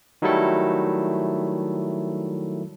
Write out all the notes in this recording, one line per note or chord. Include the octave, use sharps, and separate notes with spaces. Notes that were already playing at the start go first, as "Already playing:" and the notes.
D#3 F#3 G3 A3 E4 A4